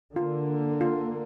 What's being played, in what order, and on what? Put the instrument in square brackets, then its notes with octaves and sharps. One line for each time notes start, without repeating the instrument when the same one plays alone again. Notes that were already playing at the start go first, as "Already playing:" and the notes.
[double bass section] D3 A#3 [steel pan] F4
[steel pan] F4